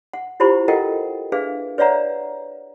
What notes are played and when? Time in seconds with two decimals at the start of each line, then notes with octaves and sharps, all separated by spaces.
0.13 F#5
0.40 E4 F4 G4 C5 B5 C#6
0.68 F4 A4 A#4 D#5 F#5 G5
1.32 D4 G#4 B4 E5 F5
1.78 B4 C#5 D5 E5 F#5 A#5